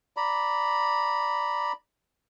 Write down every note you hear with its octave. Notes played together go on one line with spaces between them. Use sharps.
D5 A#5 B5